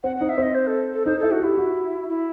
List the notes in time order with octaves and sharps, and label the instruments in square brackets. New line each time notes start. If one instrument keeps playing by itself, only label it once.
[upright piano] C4 [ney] F#5
[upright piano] D#4 [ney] F#5
[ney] E5
[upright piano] C4 [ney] D#5
[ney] C5
A4
A4
[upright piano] D#4 [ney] C5
[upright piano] E4 [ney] A4
[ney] F#4
[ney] E4 [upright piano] G4
[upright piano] F#4
[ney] E4